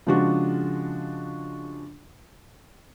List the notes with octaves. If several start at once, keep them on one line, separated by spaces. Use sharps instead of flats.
C#3 F3 G#3 D4 F4 F#4